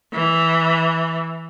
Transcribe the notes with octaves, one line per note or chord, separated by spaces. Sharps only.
E3